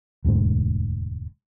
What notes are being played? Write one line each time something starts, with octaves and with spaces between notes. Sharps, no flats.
E1 D2 G#2 G#3